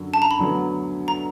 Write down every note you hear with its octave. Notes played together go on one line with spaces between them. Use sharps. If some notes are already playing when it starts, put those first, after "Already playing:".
Already playing: F#2 D3 F#3
A5
A#5
B5
D2 D3 F#3 B3
A#5